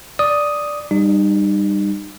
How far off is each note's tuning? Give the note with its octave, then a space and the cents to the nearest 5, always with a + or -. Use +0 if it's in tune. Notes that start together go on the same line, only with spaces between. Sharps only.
D5 +0 D#6 +0
G3 +10 D#4 -35